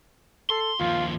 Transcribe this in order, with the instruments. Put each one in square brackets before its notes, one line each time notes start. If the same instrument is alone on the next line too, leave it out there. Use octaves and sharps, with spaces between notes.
[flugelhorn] A4 [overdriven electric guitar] C6
[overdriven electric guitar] D#2 F3 [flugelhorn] F4